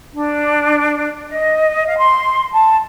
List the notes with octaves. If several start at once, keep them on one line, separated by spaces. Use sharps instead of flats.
D4
D#5
F5
C6
A5